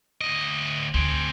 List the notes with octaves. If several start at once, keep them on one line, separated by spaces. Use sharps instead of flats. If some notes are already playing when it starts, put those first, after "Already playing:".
D2 D#5
D2 C4 G#4